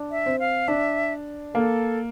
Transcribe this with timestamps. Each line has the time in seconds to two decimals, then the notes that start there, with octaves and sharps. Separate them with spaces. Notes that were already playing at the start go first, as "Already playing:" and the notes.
Already playing: D4
0.11 E5
0.26 C4
0.39 F5
0.68 D4 E5
1.55 A#3 A4